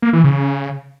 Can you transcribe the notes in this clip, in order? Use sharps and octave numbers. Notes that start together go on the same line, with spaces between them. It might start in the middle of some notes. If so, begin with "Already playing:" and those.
A#3
E3
C#3